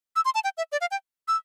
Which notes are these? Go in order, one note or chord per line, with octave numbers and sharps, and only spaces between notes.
E6
C6
A5
G5
E5
D5
F5
G5
E6